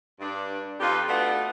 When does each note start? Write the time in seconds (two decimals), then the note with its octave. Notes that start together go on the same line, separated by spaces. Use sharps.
0.20 G2 D4
0.80 F2 D#4 F4 G4 B4
1.08 A3 B3 D4 F4 F#4